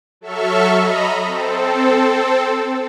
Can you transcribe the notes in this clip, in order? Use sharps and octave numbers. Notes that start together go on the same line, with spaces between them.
F#3 A4 E5 C#6 F6
D#5 A#5 B5
C4 A4